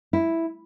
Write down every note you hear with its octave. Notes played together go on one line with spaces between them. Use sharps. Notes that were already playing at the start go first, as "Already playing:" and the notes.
E4